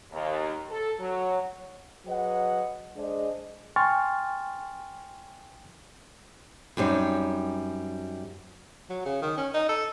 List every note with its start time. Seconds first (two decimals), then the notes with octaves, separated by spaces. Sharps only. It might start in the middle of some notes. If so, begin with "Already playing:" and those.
0.11 D#2
0.69 A4
0.99 F#3
2.06 F#3 G#4 B4 D#5 F#5
2.96 G#3 D4 G#4 C5 D#5
3.76 G5 G#5 C6 C#6 F6 A6
6.77 F#2 G3 C4 D#4
8.89 F#3
9.05 C#3
9.22 D#3
9.37 C#4
9.54 D#4
9.69 A4